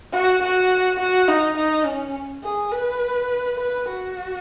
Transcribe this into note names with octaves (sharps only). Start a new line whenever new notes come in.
F#4
F#4
F#4
D#4
D#4
C#4
G#4
B4
B4
F#4